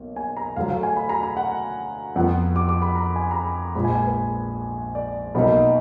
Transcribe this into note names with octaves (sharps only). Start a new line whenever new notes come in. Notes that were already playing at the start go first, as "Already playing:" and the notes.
Already playing: B1 A#3
G#5
A#5
D2 D3 F#3 F5
F5
G#5
B5
A#5
A#5
F#5
F2 F3 B3 F#5
D6
D6
B5
A#5
G#5
A#5
B5
A#1 G#2 F3 B5
G#5
G#5
B4
D5
B1 B2 F#3 A#3 D#4 B5